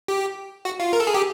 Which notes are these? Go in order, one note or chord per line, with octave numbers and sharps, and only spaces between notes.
G4
F#4
F4
A#4
A4
G#4
G4